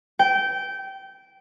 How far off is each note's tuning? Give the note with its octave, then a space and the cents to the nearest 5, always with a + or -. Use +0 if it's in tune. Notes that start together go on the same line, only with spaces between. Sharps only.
G5 -20